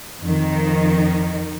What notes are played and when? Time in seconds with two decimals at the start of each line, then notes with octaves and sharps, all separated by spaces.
0.19 F2 D#3